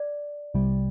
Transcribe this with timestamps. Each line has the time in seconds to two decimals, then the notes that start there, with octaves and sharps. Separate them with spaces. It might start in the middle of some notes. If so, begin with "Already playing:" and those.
Already playing: D5
0.54 C2 C3 G3